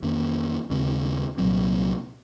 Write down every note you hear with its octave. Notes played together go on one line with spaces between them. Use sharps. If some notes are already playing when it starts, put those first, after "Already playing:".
F2 D#3 A#3 C#4
D#2 C#3 G#3 C4
C2 A#2 F#3 C4